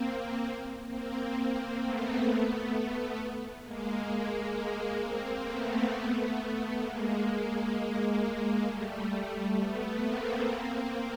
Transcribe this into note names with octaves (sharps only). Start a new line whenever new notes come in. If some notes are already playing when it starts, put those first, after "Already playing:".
Already playing: A#3 C4
A#3 C4
A3 B3
G#3 A#3
G#3 A#3
A#3 C4
A3 B3
A3 B3
G#3 A#3
G3 A3
A3 B3
A#3 C4
A#3 C4